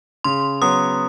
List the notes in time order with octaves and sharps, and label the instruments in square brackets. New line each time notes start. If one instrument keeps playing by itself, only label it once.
[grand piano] C#3 [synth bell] C6
[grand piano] F#3 B3 [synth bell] D#6